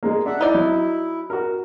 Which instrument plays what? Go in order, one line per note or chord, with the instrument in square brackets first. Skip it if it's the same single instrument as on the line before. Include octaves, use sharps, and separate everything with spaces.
[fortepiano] G#3 A#3
[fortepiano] D4 [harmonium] E5 F#5
[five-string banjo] D#4 D5 [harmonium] E4
[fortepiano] F#3
F#4 A#4